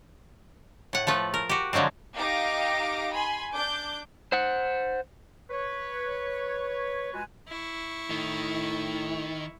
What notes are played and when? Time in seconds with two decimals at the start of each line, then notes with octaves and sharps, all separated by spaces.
0.93 A2 F#5
1.07 F3 A3 B4
1.34 A#4
1.49 F#4 G4
1.73 D3 F3 F#3 G#3 C4
2.17 D#4 G4 F5 D6 A#6
3.15 G#5 B5 C6
3.53 D4 D6 G6
4.32 C5 F#5
5.50 B4 C#5
7.13 G#3 F4 F#4 B4 G#5
7.48 E4 C#6
8.10 A2 D#3